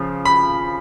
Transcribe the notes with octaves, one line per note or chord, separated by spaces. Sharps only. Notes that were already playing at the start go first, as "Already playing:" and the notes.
Already playing: C#3 F3
B5